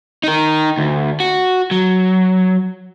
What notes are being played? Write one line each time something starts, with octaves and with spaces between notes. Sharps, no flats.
D#4 A#4
D2
F#4
F#3